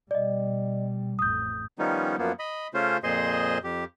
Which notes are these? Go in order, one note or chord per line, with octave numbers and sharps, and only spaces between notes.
B2 G3 D5 D#5
A1 F2 D#6 G6
D#3 F3 G3 B3 C#4 D#4
F#2 F3 A#3 B3
D#5 B5
C#3 A3 C#4 F4 C5
F2 A#2 G#4 C5 D#5 C6
F2 G4